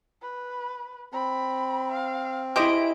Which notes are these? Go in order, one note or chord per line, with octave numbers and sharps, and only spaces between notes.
B4
C4 B5
F5
E4 G4 G#4 C5 D#5 D7